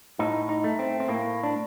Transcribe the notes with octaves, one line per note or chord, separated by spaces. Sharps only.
A2 D#4
D#4
A3
C4
C4
A2 A#3
D4